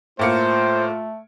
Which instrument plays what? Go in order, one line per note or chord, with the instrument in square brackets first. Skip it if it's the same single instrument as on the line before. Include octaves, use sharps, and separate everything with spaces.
[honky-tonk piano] A2 A#3 C#7 [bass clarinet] A3 [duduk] F4 [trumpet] C5